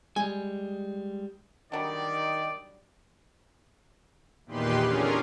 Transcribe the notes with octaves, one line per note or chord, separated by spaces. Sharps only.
G3 G#3 G#5
D3 D#3 F#3 G3 D5
E2 A#2 D#3 G4 B4 C6
D3 C#4 F4 G#4 A#4